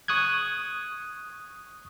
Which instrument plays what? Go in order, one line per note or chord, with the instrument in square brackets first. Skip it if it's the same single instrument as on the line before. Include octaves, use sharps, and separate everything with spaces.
[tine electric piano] C#6 D#6 F#6 G#6